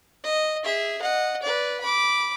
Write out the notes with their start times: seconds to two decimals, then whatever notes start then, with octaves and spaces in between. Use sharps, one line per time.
0.24 D#5
0.65 G#4 E5
1.02 D#5 F#5
1.42 B4 D5
1.81 B5 D6